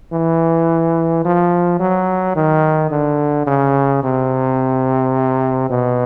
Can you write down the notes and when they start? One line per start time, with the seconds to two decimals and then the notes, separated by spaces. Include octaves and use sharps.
0.13 E3
1.25 F3
1.80 F#3
2.36 D#3
2.91 D3
3.47 C#3
4.04 C3
5.70 B2